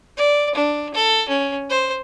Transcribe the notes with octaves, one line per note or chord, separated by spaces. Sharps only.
D5
D4
A4
C#4
C5